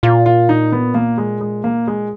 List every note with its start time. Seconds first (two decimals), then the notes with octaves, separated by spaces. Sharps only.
0.03 A#2 F4
0.26 F4
0.49 D#4
0.72 B3
0.94 A#3
1.18 G#3
1.41 G#3
1.64 A#3
1.87 G#3